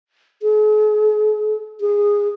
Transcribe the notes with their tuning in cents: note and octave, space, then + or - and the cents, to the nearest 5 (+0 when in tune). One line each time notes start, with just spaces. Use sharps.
G#4 +45
G#4 -15